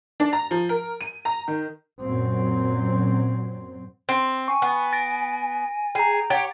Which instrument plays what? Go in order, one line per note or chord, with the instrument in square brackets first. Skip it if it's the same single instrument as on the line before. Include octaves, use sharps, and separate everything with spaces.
[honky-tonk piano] D4
A#5
F3
A#4
D#7
A#5
D#3
[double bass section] F#2 A#2 F#3 C4
[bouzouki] C4
[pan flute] G#5 [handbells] C#6
[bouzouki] B3
[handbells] A6 A#6 D7
[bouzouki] G#4 [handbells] G5 A#5
[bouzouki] G4 C#5 [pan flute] F#5 [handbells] A6